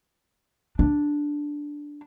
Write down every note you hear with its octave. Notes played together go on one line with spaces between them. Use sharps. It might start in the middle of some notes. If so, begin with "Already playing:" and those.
D4